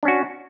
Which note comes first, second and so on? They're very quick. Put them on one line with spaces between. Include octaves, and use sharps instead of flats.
D4 C#4 F#4